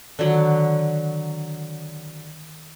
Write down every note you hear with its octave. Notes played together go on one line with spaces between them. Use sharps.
D3 D#3 F#3